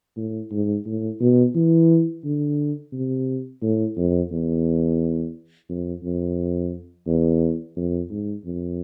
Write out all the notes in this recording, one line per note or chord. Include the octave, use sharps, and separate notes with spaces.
A2
G#2
A2
B2
E3
D3
C3
A2
F2
E2
F2
F2
E2
F2
G#2
F2